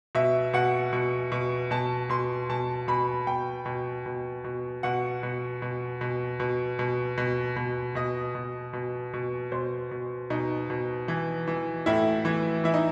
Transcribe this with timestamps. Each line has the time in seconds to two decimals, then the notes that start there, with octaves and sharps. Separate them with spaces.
0.15 B2 E5
0.54 B2 F#5
0.93 B2
1.32 B2
1.71 B2 A5
2.10 B2 C6
2.49 B2 A5
2.88 B2 B5
3.27 B2 G5
3.66 B2
4.06 B2
4.44 B2
4.83 B2 F#5
5.23 B2
5.62 B2
6.01 B2
6.40 B2
6.79 B2
7.18 B2
7.56 B2
7.95 B2 D#5
8.35 B2
8.73 B2
9.14 B2
9.52 B2 C5
9.91 B2
10.30 B2 D#4
10.70 B2
11.08 E3
11.48 E3
11.86 A2 E4
12.25 E3
12.64 E3 E4
12.74 D#4